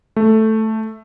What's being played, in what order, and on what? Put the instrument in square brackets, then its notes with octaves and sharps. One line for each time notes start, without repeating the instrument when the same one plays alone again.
[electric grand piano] A3